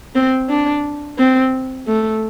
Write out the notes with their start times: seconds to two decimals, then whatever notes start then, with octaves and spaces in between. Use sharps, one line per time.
0.15 C4
0.49 D4
1.18 C4
1.87 A3